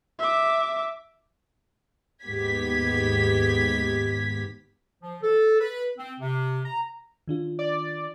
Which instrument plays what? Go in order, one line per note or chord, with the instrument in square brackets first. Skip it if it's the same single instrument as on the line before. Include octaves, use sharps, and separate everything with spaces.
[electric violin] E5 D6
[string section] D#2 G#2 B3 G4 G#6 B6
[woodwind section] F3
A4
B4
C4
C3
A#5
[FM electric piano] D#3 D4 F4
[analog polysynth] D5